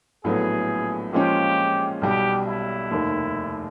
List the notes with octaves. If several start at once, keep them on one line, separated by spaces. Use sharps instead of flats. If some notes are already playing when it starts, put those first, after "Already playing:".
A#1 A2 F#3 B3 G#4
A#2 F3 G#3 C#4 G4
B1 B2 G3 G4
E4
F1 D#2 D#3